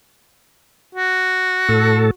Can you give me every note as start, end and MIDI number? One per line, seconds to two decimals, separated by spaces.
0.95 2.11 66
1.69 2.11 45
1.69 2.11 69